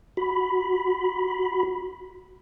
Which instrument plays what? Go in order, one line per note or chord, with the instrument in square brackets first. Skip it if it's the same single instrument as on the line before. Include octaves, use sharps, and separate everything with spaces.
[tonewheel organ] F#4 B5